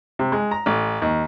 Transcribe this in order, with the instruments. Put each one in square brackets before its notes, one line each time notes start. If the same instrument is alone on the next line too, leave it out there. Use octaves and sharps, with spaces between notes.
[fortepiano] C3
G#3
A#5
A1
D#2